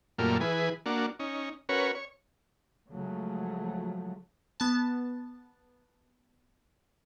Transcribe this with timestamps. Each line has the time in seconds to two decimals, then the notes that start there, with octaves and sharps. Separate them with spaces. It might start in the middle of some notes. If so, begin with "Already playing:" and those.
0.18 F#2 A#2 G3 A3 A#3 F4
0.41 E3 G#4 B4
0.86 A#3 D4 F#4
1.19 C#4 D#4
1.69 C#4 F#4 A#4 B4 C#5
1.95 C#5
2.93 C#3 F3 F#3 G#3 A3
4.60 B3 A5